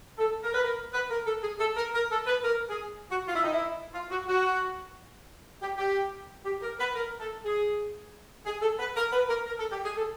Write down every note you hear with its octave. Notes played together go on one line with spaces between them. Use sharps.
A4
A#4
B4
A#4
B4
A#4
A4
G#4
A4
A#4
A#4
A4
B4
A#4
G#4
F#4
F4
E4
D#4
E4
F4
F#4
F#4
G4
G4
G4
A#4
B4
A#4
A4
G#4
G#4
A4
B4
A#4
B4
A#4
A#4
A4
G4
G#4
A4